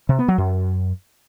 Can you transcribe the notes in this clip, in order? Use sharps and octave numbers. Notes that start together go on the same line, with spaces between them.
C3
B3
F#3
F#2